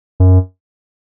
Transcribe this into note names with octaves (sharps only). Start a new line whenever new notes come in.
F#2